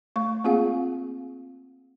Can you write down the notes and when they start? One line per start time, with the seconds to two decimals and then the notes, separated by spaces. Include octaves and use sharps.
0.16 A3 C#6
0.44 A#3 C4 F4 G#4 F5 F#5